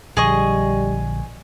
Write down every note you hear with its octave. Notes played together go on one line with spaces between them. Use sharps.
A#1 D3 G3 G#4 D#5 C#6